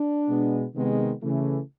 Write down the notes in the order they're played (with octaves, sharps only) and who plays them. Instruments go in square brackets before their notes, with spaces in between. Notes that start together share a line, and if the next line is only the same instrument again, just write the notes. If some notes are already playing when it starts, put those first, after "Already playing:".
Already playing: [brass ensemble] D4
B2 G#3 B3
C3 D#3 G#3 B3
C#3 E3 A3